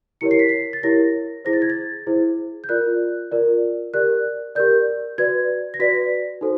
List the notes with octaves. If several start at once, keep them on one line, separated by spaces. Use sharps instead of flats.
E4 G4 A#4 C#5 C#7
C7
B6
C7
A6
E4 G4 A#4 C#5 A#6
E4 G#4 C5 A#6
A6
G#6
A6
E4 G#4 C5
G6
F4 A#4 D5 F#6
F4 A#4 D5
G4 A#4 D5 F#6
G4 A#4 D5 G6
F#4 B4 D5 G#6
A#6
F#4 B4 D5 B6
D#4 F#4 A4 C5